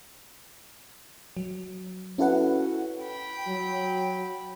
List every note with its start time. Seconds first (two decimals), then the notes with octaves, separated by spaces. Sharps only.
1.37 F#3
2.18 C#4 E4 F#4 A4 B4 F#5
3.02 G5 B5
3.46 F#3